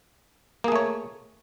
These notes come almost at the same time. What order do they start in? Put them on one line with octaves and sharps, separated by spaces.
A#3 G#4 A3 C#5